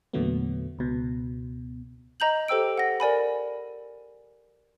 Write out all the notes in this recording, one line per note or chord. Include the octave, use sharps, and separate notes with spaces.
E2 A#2 D3 F#3 A3 B3
C#2 B2
D#5 A#5 G6 F#7
G4 A4 C5 G5 E6 D7
F#5 A#6
A#4 D5 G#5 B5